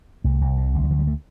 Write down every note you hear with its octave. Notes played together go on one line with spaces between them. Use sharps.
C2 A3
C2
C3
D2
G3
D3 F3
G3
A3